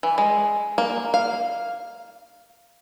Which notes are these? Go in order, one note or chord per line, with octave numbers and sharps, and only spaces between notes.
E3
G#3
A#3
F5